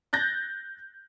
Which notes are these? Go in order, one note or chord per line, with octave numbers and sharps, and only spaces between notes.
F#6 G6 A6 A#6